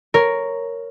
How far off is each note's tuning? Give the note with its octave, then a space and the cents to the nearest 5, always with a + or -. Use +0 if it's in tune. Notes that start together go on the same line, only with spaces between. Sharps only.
A#4 +0 C#5 +0